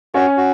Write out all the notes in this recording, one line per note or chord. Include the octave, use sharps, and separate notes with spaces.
C#4 F#4
F#4